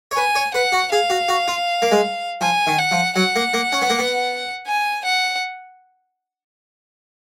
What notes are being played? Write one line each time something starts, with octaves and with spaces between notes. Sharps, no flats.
C#5
B4 G#5
C#5
B4 F#5
F#4
G#4 F5
F#4
F#4
F4
A#3
G#3
F3 G#5
D#3
F#5
F3
F#3 F#5
A#3
A#3
C#4
B3
A#3
B3
G#5
F#5